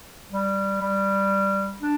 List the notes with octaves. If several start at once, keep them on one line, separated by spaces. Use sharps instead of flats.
G3
G3
D4